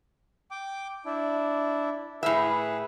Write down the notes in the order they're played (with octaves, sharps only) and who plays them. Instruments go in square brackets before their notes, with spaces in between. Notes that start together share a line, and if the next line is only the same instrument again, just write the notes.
[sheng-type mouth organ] G5 D6
D4 E4
[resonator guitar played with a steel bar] A2 E5 [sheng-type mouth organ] G#4 B4